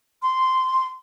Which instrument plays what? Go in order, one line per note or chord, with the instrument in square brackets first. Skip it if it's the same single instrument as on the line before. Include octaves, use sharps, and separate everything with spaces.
[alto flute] C6